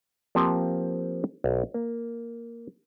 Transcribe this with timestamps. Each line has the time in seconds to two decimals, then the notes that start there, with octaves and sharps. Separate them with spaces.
0.35 F3 A#3 C4 G4
1.44 B1
1.74 A#3